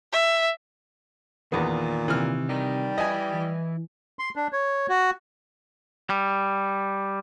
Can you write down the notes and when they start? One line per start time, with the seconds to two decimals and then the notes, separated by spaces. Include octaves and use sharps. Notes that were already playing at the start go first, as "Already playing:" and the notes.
0.13 E5
1.52 E2 A#2 D#3 B3
2.08 C3 E3 F6
2.49 G3 D#4 A#4
2.98 E4 B4 D#5 G#5
3.34 E3
4.19 C6
4.36 D4
4.53 C#5
4.89 F#4
6.10 G3